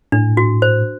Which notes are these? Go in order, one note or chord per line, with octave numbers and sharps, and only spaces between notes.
A2 D4
F#4
C5